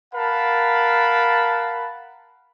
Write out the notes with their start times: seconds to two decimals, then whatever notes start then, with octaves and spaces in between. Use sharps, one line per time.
0.14 A#4 F5 F#5 A5 B5